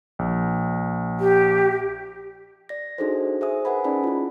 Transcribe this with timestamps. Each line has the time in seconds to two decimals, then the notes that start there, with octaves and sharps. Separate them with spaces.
0.19 A#1
1.20 G4
2.69 D5 A#6
2.98 D4 D#4 F#4 G#4 A4 C5
3.41 G#4 C5 E5 G#5 D#6
3.65 A#4 B4 F#5 G#5 B5
3.84 C#4 D#4 G#4 D5 A5 B5
4.04 E4 F4